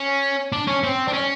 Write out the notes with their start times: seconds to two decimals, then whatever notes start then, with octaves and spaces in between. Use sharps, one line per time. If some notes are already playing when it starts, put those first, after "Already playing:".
Already playing: C#4
0.52 D4
0.67 C#4
0.83 C4
1.08 D4
1.13 C#4